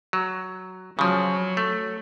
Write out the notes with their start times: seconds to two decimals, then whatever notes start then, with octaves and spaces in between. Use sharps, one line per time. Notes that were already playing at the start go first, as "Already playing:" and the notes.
0.13 F#3
0.99 C#3 F3 F#3
1.57 A3